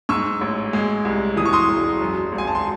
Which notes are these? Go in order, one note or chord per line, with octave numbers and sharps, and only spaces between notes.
G#2 C#6 E6
A1
G#3
C2
E3 D#6
C#6
C6 D#6
E1
F#2
G#1
G#5
A5
C6